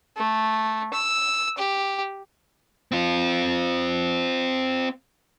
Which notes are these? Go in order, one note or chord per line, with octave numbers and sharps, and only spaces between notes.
A3
E6
G4
C4 F4